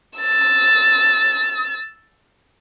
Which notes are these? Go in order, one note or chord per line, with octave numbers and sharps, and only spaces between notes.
E6 A6